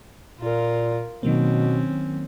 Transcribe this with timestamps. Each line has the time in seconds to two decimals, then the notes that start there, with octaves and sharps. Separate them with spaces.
0.40 A#2 F4 A#4
1.23 B2 D#3 F#3 A#3 C4 C#4